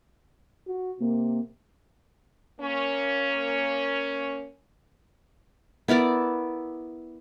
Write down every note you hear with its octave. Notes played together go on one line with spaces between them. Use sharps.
F#4
C3 A#3
A#3 C#4
B3 E4 A#4 D5